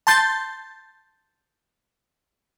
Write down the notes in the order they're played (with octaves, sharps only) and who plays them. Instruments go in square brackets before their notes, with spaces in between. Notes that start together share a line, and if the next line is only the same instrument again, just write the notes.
[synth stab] A5 C6 G6 A6